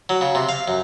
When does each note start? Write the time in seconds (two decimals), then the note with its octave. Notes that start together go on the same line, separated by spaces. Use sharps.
0.09 F#3
0.21 C#3
0.35 C3
0.49 F5
0.68 F#2